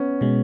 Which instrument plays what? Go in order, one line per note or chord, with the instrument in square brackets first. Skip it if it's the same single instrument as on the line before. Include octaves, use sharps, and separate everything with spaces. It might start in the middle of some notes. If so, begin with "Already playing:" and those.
Already playing: [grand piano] B3 C#4
[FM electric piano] B2 G#3